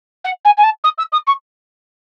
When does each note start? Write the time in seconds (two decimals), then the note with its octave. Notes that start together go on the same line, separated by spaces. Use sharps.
0.24 F#5
0.45 G#5
0.57 G#5
0.63 A5
0.84 D#6
0.98 E6
1.12 D#6
1.27 C#6